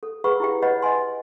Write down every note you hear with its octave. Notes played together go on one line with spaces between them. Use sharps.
A4
G#4 B4 F#5 B5 C#6 E6
E4 G4 G5
B4 C#5 D#5 F#5 B5
D#5 G5 G#5 C6